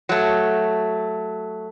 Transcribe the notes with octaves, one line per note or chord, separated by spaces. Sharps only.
F#3 A3